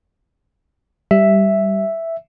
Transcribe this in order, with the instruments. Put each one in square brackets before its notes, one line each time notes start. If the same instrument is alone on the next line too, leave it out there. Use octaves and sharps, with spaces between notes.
[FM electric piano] G3 [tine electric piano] E5